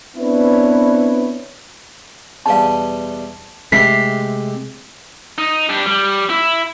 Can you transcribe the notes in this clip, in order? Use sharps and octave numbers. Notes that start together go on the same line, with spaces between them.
B3 C4 D4 E4 B4 C#5
E2 B2 G3 F5 A5
C3 G#3 A3 G4 B6 C7
D#4
G3 D4
G3
E4